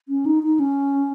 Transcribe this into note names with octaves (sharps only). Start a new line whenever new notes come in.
C#4
D#4
D#4
C#4